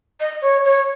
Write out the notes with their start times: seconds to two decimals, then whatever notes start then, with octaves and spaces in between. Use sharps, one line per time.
0.20 D#5
0.42 C#5
0.64 C#5